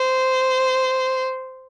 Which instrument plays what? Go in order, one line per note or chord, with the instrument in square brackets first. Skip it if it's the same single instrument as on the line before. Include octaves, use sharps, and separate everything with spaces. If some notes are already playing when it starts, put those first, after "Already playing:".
Already playing: [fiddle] C5